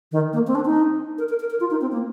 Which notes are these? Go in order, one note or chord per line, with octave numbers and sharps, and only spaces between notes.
D#3
A#3
C4
D4
D#4
A#4
A#4
A#4
A#4
F4
D#4
C4
A#3